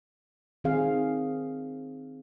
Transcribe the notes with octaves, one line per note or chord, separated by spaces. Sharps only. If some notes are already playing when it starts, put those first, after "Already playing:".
D#3 C4 G#4 F5